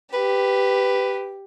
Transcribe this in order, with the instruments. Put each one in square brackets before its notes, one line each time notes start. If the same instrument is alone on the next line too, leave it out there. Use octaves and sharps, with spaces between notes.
[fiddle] G4 [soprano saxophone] B4